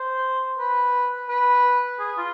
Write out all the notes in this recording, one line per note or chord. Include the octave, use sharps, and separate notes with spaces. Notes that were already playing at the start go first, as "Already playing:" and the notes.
Already playing: C5
B4
B4
G#4
F4